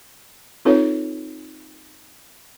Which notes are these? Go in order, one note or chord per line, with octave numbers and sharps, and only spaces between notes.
C4 D#4 F4 A4 B4 C#5